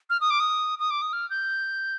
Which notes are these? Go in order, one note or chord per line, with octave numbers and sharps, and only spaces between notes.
F6
D#6
D6
D#6
D#6
D6
D#6
F6
G6